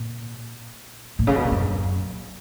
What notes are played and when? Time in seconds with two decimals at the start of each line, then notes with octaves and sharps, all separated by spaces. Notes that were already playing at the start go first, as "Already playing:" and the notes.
Already playing: A#2
1.19 A#2
1.27 C#3
1.36 B2
1.43 A#2
1.51 F#2